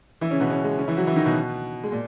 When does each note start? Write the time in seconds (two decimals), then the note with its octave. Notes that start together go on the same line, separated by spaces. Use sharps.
0.21 E3 E4
0.30 C#3 C#4
0.40 B2 B3
0.50 C#3 C#4
0.64 G#3
0.78 C#3 C#4
0.88 E3 E4
0.97 F#3 F#4
1.07 E3 E4
1.16 D#3 D#4
1.26 B2 B3
1.84 G#3
1.92 A#2